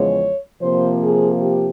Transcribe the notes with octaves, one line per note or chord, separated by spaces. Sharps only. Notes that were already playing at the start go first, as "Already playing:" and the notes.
Already playing: E2 C#3 F3 G#3 C#5
C3 F3 A#3 C5
G#4
G4